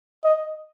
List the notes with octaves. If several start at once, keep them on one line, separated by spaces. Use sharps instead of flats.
D#5